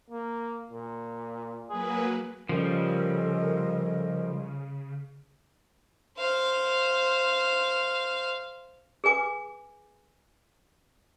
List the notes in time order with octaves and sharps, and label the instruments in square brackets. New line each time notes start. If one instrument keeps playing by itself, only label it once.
[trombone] A#3
A#2
[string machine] F#3 A#3 B4 [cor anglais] G#4
[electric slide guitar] C#3 [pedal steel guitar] F3 G3 [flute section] A4 A#4 D#5
[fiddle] C5 F5
[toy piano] G#4 B4 G#5 D6